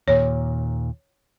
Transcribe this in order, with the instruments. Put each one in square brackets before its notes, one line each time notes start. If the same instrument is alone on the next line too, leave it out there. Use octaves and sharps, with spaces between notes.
[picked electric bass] D#2 A#2 [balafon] C#5